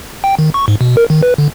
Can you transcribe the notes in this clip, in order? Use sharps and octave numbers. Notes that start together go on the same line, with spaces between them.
G5
D#3
C#6
G#2
B2
A#4
D#3
B4
D3